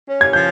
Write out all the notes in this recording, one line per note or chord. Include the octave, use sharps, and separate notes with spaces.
C#4
G#6
F3 G6